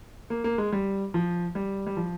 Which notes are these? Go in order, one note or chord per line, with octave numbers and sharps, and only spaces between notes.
A#3
A#3
G#3
G3
F3
G3
G3
F3